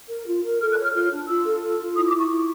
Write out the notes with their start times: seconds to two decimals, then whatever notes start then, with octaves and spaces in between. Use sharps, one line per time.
0.10 A#4
0.27 F4
0.44 A#4
0.61 A4 F6
0.72 F#6
0.77 C#5
0.83 F6
0.94 F4 F6
1.11 D4
1.28 F4 E6
1.45 A4
1.62 F4
1.79 F4
1.96 E4 D#6
2.07 D6
2.13 E4 C#6
2.30 E4